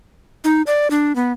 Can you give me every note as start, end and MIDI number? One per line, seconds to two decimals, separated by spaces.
0.44 0.62 63
0.67 0.88 74
0.91 1.15 62
1.16 1.32 59